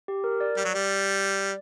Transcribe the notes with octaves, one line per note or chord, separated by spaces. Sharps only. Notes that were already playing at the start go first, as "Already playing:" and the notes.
G4
A#4
D5
G3
F#3
G3